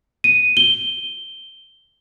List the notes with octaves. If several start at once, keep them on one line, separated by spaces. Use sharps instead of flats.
D#7
G7